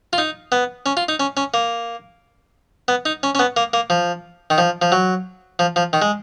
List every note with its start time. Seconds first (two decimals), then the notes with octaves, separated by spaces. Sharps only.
0.13 F4
0.18 D#4
0.52 B3
0.86 C#4
0.97 F4
1.08 D#4
1.20 C#4
1.37 C#4
1.54 A#3
2.88 B3
3.06 D#4
3.23 C#4
3.35 C#4
3.39 B3
3.57 A#3
3.73 A#3
3.90 F3
4.50 D#3
4.58 F3
4.82 F3
4.92 F#3
5.59 F3
5.76 F3
5.93 D#3
6.02 G#3